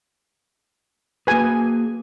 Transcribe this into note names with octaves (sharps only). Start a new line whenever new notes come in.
A#3 F#4 G#4 B4 G#5